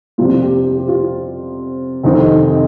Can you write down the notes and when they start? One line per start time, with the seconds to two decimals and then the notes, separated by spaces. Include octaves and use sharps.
0.18 F2 C3 G3 F4
0.41 G4
0.64 G4
0.77 G4
0.88 F4
2.03 F1 F2 D#3 C4 D#4